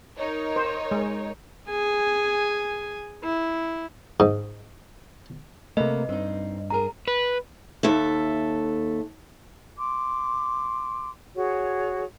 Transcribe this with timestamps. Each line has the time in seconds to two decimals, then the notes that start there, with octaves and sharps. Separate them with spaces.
0.17 D#4 A#4 C#5
0.56 C5
0.91 G#3
1.68 G#4 G#5
3.24 E4
4.20 G#2
5.77 C3 A3 A#3 A4 B4 D#5
6.09 G2 C4 D#4
6.70 D4 G#4 A#4 A#5
7.08 B4
7.83 D#2 A4 E5
9.77 C6 D6
11.35 F#4 G#4 C#5